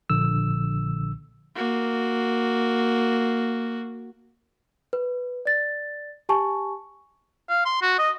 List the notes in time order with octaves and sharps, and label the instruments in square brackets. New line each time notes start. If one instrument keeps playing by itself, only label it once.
[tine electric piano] A#1 D3 E6
[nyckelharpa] A#3 F#4
[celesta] B4
D5 A6
G4 G#5 A5 C#6
[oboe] F5
C6
F#4
D#5